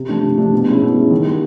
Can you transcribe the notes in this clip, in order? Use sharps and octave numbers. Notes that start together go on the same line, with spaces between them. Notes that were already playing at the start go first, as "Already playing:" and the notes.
Already playing: C3
F3 A3 D4
C3
F3 A3 D4
B2
G#3 C#4 E4
B2
G#3 C#4 E4
D#3
G3 A#3